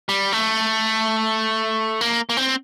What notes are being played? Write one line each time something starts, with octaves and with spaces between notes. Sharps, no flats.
G3
A3
A#3
A#3
C4